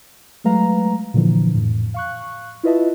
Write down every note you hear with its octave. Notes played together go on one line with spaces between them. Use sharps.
F#3 G#3 A3 B4 F5 A#5
A#2 D3 E3 F3
F2 A2
F5 C#6 F#6
E4 F4 B4 D#5 E5 A5